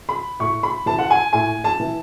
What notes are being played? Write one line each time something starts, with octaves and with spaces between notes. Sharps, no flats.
B5
A2 C#6
B5
E3 A5
F#5
G#5
A2 G#5
A5
E3